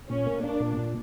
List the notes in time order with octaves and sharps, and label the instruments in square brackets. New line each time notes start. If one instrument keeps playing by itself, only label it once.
[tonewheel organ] A#2 [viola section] C#4
[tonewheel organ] A#3
[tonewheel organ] A#3 [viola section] D4
[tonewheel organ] A#2
A#2